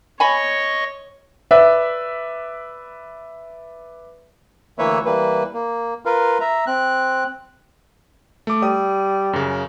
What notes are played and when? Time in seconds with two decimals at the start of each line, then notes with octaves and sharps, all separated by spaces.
0.20 C#5 D#5 G#5 B5 C#6
1.51 B4 D5 E5
4.79 D2 E3 A#3 B4 C#5 E5
5.05 E3 G3 A#3 B4
5.54 A#3
6.05 F4 A#4 B4 F5
6.41 E5 A#5
6.67 C4 F#6
8.47 A3 D6
8.63 G3 D#6
9.33 F#2 C#3